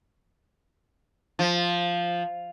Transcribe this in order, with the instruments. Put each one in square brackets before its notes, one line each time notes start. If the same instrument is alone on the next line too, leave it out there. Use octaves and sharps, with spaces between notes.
[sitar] F3